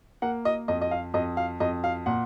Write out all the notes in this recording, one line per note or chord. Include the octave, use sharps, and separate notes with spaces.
A#3 F#5
D#5
F2 D#5
D#5
F5
F2 D#5
F5
F2 D#5
F5
A#2 F#5